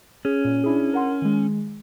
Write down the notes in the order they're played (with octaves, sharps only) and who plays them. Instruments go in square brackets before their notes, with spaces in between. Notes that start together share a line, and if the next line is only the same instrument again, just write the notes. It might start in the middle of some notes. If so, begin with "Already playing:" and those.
[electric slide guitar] C#4 [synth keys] G#4
[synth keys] A#2
D4 E4 G#4
A#4 F#5 C6
D#3 G#3